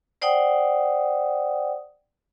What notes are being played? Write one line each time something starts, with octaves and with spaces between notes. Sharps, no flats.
C5 D5 F#5 G5 D#6